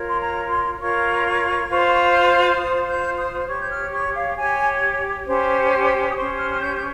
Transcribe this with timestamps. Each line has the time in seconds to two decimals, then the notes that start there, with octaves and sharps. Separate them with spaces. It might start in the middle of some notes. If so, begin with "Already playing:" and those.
Already playing: F4 A#4 C#5
0.09 C6
0.20 A#5
0.49 C6
0.79 F4 A#4 C#5 C#6
1.69 F4 C5
2.58 F4 C5 D#6
2.88 G6
3.18 D#6
3.47 G4 C#5 C#6
3.61 G6
3.70 F6
3.93 C#6
4.15 F5
4.37 G4 C#5 G#5
5.27 C#4 G4 C5
6.10 D#6
6.16 C#4 G4 C5 C#6
6.38 F6
6.50 F6
6.61 G6
6.77 G6